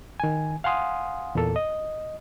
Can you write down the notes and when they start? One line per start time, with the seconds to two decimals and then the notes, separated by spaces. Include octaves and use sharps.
0.20 D#3 G#5
0.64 F5 F#5 G#5 C6 D#6
1.35 E2 A#2 A#3 A4
1.56 D#5